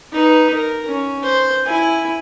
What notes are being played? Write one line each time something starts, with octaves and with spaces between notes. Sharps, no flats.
D#4 B4
A#4
C#4
C5
E4 G#5